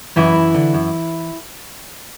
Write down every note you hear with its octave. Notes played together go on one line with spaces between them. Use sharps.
F#2 E3 E4
F#2
D3
F#2